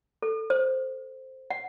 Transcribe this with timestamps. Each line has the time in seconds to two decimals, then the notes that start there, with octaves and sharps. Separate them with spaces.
0.22 A4
0.50 C5
1.50 F#5